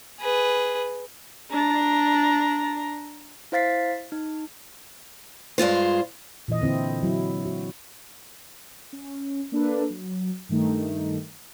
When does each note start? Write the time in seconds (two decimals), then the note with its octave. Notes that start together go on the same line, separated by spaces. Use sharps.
0.21 G#4 B4
1.52 D4 A#5
3.52 E4 C5 F5 A6 B6 C7
4.12 D#4
5.58 G2 G#3 F4 C5
6.48 A#2 E3 D#5
6.62 D3 C4 E4
7.03 F#3 E4
7.45 F#4
8.93 C#4
9.52 A#3 D4 A4 B4
9.90 F#3
10.49 G2 D#3 A3 D#4